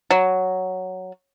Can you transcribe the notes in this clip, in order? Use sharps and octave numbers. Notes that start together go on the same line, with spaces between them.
F#3